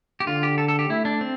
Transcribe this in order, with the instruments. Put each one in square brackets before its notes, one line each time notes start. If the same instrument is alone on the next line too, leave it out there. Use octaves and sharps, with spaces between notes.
[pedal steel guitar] G4
[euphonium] D3 [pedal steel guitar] F4
[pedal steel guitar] G4
A4
A4
G4
[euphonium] A3 [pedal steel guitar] E4
[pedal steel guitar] D4
C4